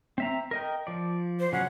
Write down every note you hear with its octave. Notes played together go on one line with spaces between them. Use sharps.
C4 E5 A#5
A#4 D#5 G5
F3 D5
C5
C#3 F#3 C#4 F#5